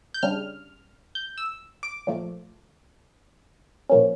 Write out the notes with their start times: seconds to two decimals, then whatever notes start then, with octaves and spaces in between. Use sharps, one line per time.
0.14 G6
0.23 C#3 G3 D4 F6
1.15 G6
1.38 E6
1.83 D6
2.07 A#2 F3 A3
3.89 A#2 F3 A#3 C#4